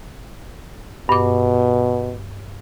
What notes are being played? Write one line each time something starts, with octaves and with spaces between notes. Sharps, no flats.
G2 B2 D6